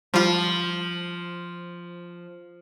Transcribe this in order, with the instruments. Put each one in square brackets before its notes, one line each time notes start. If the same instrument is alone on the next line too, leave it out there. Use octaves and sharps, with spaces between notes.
[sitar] F3 [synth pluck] G3 F4